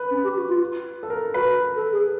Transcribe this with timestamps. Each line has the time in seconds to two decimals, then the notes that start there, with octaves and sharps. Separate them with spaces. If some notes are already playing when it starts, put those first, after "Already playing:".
Already playing: B4
0.10 C#4
0.23 G4
0.36 F#4
0.48 F4
1.03 A4
1.10 A#4
1.34 F#4 B4
1.75 A4
1.92 G#4